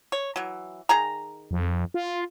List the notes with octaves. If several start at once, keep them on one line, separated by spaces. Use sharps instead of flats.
C#5
E3 F#3
D#3 G#4 A#5
F2
F4